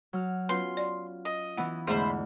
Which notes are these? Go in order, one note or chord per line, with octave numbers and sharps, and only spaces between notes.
F#3 F6
B3 C#4 F4 B4 C6
D5
D#5
E3 B3 E4 F#5
E2 G#2 D3 A3 G#4 C5 E5 B5